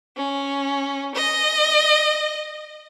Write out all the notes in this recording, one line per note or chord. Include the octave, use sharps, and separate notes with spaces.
C#4
D#5